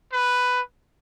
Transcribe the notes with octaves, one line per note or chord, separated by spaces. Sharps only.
B4